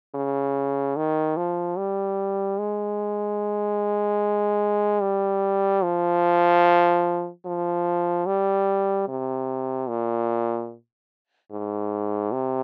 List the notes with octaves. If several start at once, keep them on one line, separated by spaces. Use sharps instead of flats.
C#3
D#3
F3
G3
G#3
G3
F3
F3
G3
C3
A#2
G#2
C3